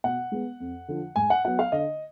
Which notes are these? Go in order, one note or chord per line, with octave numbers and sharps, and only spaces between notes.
B2 F#5
G#3 B3
F2
D3 F3
G#2 G#5
F#5
F#3 B3 F#5
F5
D3 D#5